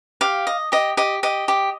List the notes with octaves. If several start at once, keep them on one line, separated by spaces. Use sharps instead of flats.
G4 F5
D#5
G4 D#5
G4 D#5
G4 D#5
G4